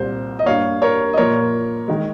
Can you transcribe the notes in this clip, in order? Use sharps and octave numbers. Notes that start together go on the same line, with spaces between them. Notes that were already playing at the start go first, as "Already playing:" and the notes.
Already playing: C2 A#2 G3 A#3 C5
D#5
G2 G3 A#3 C#5 F5
A#4 C#5
D#5
A#2 F3 A#3 A#4 C#5
D#3 G#3